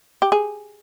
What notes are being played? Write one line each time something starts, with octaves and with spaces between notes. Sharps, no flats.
G4
G#4